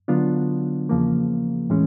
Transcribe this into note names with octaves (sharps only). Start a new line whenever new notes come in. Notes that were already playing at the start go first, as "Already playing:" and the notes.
D3 F#3 B3 D4 F4
E2 C#3 F3 A#3
A2 E3 G#3 C#4